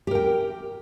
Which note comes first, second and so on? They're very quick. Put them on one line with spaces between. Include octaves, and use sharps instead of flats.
G4 A#4 G5